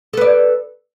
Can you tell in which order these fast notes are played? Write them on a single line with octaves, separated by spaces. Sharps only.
A4 B4 D5